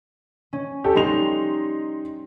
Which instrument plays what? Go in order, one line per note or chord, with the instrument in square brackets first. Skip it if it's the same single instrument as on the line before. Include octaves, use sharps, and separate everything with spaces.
[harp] C#4
[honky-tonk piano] G4 A4
[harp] G3 [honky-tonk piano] D#4 C6 F7